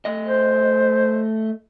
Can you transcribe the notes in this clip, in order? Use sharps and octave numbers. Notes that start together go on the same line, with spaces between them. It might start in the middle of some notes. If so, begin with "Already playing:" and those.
A3 D#5
C5